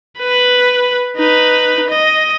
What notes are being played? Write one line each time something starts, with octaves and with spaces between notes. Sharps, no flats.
B4
D#4 B4
D#5